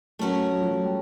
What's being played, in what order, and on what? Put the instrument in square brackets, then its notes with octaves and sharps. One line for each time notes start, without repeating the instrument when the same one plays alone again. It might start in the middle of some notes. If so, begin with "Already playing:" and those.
[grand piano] F#3 [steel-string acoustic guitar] A3 C#4 F#4 A#4
[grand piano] F#3
F3
F#3
G3